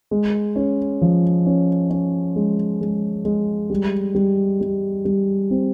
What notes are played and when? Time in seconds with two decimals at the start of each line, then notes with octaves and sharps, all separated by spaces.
0.11 G#3
0.56 C#4
1.01 F3
1.46 C#4
1.90 C#4
2.36 G#3
2.81 G#3
3.25 G#3
3.70 G3
4.15 G3
4.61 G3
5.05 G3
5.50 C4